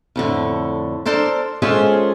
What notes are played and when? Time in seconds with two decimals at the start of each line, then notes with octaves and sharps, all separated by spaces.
0.16 F2 A2 D3
1.06 D4 A4 A#4 C5
1.62 G#3 C#4 F4 G#4 A4 C5